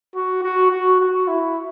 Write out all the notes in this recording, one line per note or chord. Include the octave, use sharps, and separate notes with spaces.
F#4
F#4
F#4
F#4
E4